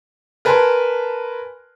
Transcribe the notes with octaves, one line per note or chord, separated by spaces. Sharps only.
A#4 B4 G#5 A5 C6